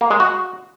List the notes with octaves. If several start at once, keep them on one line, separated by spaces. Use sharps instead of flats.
A#3
G#3
F#4